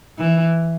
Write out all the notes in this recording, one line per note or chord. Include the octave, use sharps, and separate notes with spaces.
E3